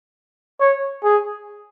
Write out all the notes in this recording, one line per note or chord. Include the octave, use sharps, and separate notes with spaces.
C#5
G#4